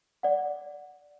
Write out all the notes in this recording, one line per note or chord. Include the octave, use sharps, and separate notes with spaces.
D5 F#5